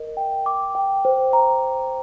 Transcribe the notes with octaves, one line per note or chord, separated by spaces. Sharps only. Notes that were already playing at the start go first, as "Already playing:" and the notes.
Already playing: A#4 D#5
G5
D6
G5
C5
A#5